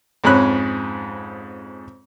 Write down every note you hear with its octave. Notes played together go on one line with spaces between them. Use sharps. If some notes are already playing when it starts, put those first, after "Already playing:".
F2 G#2 C#4 B5 F#6